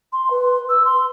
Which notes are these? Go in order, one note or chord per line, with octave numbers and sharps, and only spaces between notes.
C6
B4
E6
C6